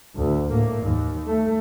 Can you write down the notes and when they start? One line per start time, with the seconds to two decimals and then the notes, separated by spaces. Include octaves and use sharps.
0.16 D2
0.50 A2 A#3
0.83 D#2
1.27 A3